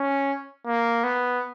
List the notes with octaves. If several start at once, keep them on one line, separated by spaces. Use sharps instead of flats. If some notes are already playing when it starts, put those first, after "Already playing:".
Already playing: C#4
A#3
B3